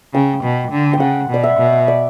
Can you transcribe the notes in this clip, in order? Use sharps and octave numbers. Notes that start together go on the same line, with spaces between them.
C#3 G5
B2
D3
G5
C#3 F#5
B2 D5
E5
B2
D5